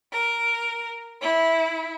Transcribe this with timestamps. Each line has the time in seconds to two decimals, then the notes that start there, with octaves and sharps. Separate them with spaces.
0.13 A#4
1.22 E4